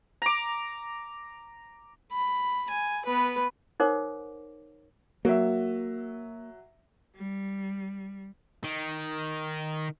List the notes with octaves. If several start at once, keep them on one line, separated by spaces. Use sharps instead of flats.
A#5 D6
B5
G#5
B3 B4
D#4 A#4 C5 C#5 F#5 D6
F#3 A#3 E5
G3
D#3